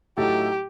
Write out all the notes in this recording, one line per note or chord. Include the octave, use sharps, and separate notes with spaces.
A2 F#3 A3 D#4 G4 A4